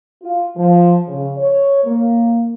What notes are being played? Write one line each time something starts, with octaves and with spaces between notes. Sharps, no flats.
F4
F3
C#3
C#5
A#3